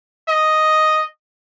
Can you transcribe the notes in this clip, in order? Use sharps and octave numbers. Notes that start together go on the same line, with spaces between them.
D#5